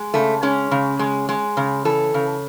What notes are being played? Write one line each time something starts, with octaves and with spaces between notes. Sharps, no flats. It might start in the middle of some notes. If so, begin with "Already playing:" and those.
Already playing: G#3
C#3 A3
G#3 C#4
C#3
G#3
G#3
C#3
E3 A4
C#3